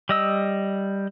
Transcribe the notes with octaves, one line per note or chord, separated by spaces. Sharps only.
G3 D#5 E6